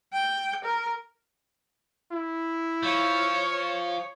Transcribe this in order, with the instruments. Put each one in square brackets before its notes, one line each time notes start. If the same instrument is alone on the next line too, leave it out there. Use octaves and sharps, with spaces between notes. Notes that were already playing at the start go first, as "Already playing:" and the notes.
[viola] G5
A#4
[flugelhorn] E4
[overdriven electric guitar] F3 [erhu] C#5